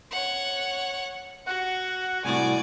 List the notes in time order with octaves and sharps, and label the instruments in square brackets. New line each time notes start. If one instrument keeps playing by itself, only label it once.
[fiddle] C#5 F#5
[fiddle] F#4 [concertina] F#5
[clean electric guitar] C2 A2 F#4 [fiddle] D5 [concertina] G#5